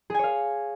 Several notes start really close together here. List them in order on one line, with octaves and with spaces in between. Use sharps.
G#4 G#5 C#5 F5